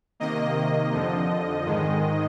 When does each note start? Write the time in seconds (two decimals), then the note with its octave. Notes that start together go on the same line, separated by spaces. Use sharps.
0.20 C3 D#3 A#3 D#5
0.92 F2 D3 F3
1.64 G#2 D#3 G#3